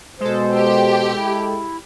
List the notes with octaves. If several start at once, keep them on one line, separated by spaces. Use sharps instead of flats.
B2 G#3 A4 C5
G4
E4